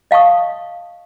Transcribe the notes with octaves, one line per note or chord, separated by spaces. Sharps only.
D#5 F5 A5 C#6 D#6